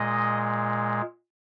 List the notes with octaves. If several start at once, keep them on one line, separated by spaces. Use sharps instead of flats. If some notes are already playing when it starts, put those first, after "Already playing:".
Already playing: A#2 G#3 D#5